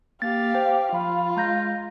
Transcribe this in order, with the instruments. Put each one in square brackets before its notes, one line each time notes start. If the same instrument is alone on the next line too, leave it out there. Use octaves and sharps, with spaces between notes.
[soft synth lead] A#3 [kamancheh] G4 F5 [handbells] A6
[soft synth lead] C5 [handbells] G5
[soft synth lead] F3 [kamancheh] F4 [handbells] F5 B5
[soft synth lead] G#3 [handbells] A#5 G6 A#6